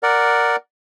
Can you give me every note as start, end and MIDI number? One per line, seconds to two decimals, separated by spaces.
0.03 0.56 70
0.03 0.56 74
0.03 0.56 78